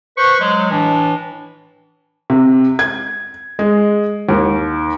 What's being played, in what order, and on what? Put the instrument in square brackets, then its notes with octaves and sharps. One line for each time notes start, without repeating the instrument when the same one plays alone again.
[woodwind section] B4 C5 C#6
F#3 G#3
A2 E3 D4
[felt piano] C3
G#6
G#3
D#2